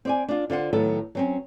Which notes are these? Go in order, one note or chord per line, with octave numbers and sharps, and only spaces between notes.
C4 D5 G#5
D4 F4
D3 F4 C5 F#5
A2 D#3 F#3 B3 A4
F#3 C4 C#4